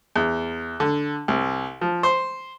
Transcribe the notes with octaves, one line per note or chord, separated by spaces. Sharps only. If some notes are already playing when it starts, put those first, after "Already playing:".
E2
D3
C2
F3
C5